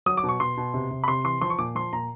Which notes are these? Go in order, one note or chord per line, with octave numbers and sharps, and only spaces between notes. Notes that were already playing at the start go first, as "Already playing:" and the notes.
F#3 D#6
D6
B2
C#6
B2 C6
B2
C3
C3
B5
C3 C6
E3 C6
F3 C6
C#6
A#2 D6
F3 C6
A#2 A#5